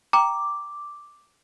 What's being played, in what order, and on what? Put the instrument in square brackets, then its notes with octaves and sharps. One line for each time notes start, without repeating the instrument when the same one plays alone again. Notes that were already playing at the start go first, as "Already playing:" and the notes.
[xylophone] G5 A#5 [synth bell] D6